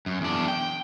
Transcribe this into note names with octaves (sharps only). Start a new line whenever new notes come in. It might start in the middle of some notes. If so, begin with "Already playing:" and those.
F#2
E2 D4
G5